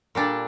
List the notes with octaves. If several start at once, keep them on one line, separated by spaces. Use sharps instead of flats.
A#2 G3 D4 A4